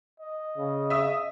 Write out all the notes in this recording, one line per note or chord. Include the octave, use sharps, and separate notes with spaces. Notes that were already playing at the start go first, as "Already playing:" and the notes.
D#5
C#3
E5 D#6